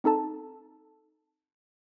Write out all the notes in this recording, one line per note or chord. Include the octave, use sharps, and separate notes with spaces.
C4 D#4 A4 A5 A#5